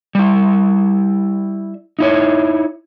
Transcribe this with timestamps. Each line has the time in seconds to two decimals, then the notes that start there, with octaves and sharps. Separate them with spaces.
0.15 G3 E4
1.99 D#4 E4 C#5